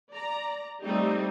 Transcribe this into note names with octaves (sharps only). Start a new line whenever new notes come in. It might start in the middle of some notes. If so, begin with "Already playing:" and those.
D5 A#5
G3 A3 C4 D#4 G4